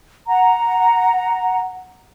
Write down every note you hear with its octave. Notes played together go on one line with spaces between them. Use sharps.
F#5 A#5